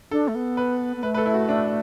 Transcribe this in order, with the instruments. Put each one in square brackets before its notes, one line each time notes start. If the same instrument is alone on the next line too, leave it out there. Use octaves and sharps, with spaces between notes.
[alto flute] D4 [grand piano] A4
[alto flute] A3
B3
[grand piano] B4
[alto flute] B3
[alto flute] A3 [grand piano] B4
[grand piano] B4
A4
E4
F#4
D4